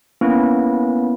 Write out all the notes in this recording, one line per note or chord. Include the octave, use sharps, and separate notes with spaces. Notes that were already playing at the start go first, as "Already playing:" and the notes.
A#3 B3 C#4 E4 B4